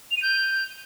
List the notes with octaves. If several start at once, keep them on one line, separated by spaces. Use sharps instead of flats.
F7
D#7
G6